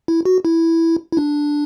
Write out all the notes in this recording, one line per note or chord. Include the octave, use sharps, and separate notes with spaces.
E4
F#4
E4
E4
D4